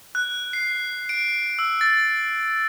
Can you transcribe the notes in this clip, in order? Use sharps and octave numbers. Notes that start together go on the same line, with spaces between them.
F#6
C7
D7
E6
A6